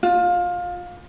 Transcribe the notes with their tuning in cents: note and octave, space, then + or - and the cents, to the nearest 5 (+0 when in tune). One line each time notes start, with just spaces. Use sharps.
F4 +20